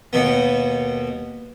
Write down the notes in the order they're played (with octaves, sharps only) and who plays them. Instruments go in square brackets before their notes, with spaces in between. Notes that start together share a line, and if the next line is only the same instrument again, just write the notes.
[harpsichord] D#2 B2 B3